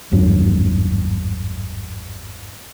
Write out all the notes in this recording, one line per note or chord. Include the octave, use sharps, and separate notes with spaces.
G#1 E2 G2 F#3